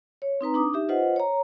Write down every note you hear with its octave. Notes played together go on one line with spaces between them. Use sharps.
C#5
C4 D#4 B4 A#5
D4 D6 D#6
D#4 G4 E5
F4 B4 C5 D#5 F#5
C#5 A#5